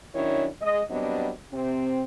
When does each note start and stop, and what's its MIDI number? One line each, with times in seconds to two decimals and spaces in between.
0.14 0.47 51
0.14 0.47 54
0.14 0.47 61
0.14 0.47 62
0.14 0.47 64
0.14 0.47 73
0.61 0.80 56
0.61 0.80 75
0.90 1.30 54
0.90 1.30 55
0.90 1.30 59
0.90 1.30 60
0.90 1.30 62
0.90 1.30 75
1.52 2.04 48
1.52 2.04 60